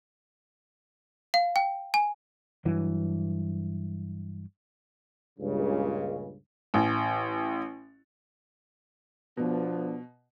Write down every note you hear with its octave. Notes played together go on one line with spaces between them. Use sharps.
F5
G5
G#5
G2 E3 F#3
C#2 G2 A#2 C#3
A1
B2 F3 B3 D4